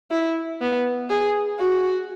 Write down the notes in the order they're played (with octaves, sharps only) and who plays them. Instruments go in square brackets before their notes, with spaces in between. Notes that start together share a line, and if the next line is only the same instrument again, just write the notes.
[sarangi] E4
B3
G#4
F#4